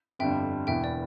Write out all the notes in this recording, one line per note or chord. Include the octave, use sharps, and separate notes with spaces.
G1 F2 D3 G3 E5 G5
E1 E2 E3 E5 G5
D5